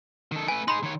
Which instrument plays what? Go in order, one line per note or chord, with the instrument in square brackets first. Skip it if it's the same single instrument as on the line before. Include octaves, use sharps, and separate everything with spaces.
[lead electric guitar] D#3 A4
[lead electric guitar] A3 B4 [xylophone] G#5
[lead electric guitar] D#4 G#4 [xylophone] B5 C6
[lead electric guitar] D#3 C#5